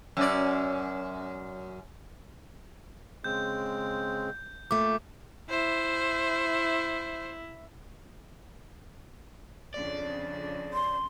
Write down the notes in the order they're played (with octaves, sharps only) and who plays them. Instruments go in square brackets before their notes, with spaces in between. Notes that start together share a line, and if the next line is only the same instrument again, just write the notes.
[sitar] F#2 C#4 D5
[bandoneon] C#3 G#3 C4 [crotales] G6
[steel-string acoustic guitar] A#2 A3 [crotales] D6
[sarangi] E4 [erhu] C5
[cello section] F2 C#3 D4 [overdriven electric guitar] D5
[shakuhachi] C6